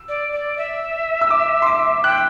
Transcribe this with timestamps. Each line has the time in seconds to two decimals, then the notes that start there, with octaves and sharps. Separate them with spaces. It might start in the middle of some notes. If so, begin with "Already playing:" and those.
Already playing: E6
0.09 D5
0.33 D5
0.58 E5
1.21 E6
1.30 D6
1.62 C6
1.66 D6
2.04 G5 F#6